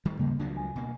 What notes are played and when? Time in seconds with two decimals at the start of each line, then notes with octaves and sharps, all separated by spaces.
0.05 D#3 G3 A3
0.19 D#2 G#2 C#3 G3 A#3
0.39 C#2 F3 F#3 D4
0.57 G#5
0.76 B2 A#3